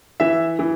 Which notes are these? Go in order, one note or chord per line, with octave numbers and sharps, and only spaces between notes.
E3 E5
E3